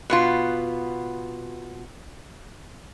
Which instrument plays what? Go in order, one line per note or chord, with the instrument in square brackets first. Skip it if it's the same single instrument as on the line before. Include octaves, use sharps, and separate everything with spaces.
[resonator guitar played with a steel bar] B2 B3 F4